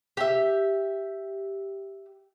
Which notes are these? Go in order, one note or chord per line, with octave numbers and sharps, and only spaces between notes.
G4 E5